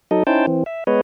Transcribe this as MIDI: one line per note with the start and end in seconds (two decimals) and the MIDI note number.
0.11 0.23 54
0.11 0.23 63
0.11 0.23 69
0.11 0.23 75
0.27 0.46 61
0.27 0.46 63
0.27 0.46 64
0.27 0.46 72
0.27 0.46 79
0.27 0.46 81
0.47 0.64 52
0.47 0.64 60
0.66 0.84 76
0.87 1.01 56
0.87 1.01 59
0.87 1.01 71
0.87 1.01 73
0.87 1.01 75